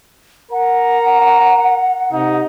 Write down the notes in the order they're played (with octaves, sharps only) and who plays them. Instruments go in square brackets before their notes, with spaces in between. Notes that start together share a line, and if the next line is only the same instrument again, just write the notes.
[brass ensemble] A#4 A#5 [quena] F#5
[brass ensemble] C3 D#4